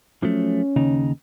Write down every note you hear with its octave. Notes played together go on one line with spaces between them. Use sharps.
F3 F#3 A3 C#4
D#2 C#3 D#4